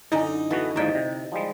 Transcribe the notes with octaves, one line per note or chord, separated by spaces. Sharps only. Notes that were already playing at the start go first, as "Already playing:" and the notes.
F#2 D3 D#4 E4 G#5
E3 B3 F#4 A4
D#2 G#2 F3 E4 D#5 E5 G5
C3 D#5
F3 G3 G#3